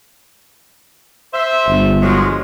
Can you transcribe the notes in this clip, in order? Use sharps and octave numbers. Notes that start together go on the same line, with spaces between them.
C5 E5
G1
F3 F#3 G#3